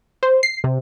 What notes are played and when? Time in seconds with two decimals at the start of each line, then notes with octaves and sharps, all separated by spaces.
0.23 C5
0.43 C7
0.64 C3